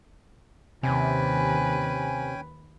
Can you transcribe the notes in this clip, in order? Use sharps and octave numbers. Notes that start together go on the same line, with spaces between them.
D#2 C3 C#4 B4 G5 G#5